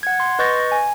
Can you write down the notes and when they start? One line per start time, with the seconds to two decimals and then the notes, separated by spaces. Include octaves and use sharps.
0.03 F#5 G#6
0.20 C6
0.39 B4 D#5 C#6 G6 A6 A#6
0.72 G#5